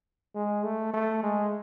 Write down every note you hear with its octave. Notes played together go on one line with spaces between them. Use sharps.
G#3
A3
A3
G#3